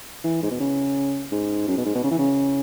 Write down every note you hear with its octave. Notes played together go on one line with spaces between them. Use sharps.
E3
G#2
B2
C#3
G#2
F#2
B2
G#2
B2
C#3
E3
C#3